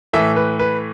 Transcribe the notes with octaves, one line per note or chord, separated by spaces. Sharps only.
A2 E3 A3 E5
B4
B4